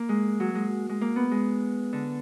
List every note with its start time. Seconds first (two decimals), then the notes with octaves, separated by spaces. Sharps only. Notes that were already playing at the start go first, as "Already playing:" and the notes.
Already playing: A#3
0.09 G#3
0.40 F#3
0.55 G#3
0.89 G#3
1.01 A#3
1.16 B3
1.31 G#3
1.93 D3